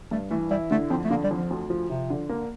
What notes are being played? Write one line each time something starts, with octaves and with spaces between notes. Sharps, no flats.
G2 A3
E3 A3
G3 E4
D3 A3
F2 C4
A3
D3 A#3
G3
F2
F3
D2
F3
C3 F3
D3
A#3